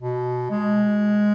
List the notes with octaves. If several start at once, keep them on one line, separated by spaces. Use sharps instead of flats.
B2
G#3